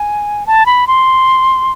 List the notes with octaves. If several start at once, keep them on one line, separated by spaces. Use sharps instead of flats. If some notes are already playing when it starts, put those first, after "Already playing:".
Already playing: G#5
A5
B5
C6